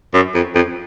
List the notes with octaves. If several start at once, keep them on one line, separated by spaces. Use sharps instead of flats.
F#2
F2
F2